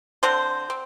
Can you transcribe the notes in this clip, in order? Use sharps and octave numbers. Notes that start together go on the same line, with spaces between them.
D3 C4 C5
C4